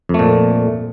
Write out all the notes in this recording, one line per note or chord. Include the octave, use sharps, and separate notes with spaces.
F2 A#2 A3